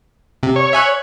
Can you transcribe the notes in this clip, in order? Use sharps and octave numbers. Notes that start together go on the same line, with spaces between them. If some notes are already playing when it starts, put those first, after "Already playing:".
C3
C#5
E5 G#5 F#6